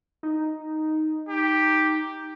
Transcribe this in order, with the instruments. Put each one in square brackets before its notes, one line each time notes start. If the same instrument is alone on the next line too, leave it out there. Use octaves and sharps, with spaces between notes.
[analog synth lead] D#4
[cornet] G4